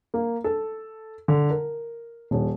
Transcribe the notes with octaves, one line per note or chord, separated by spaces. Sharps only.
A#3
A4
D3
A#4
D#1